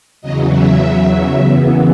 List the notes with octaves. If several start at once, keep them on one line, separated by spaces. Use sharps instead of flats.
E2 C#3 F#3 D#5
E5
E5
F#2 C#3 E3 B3